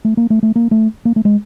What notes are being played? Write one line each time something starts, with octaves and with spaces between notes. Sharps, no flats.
A3
A#3
A3
A3
A#3
A3
A#3
A3
G#3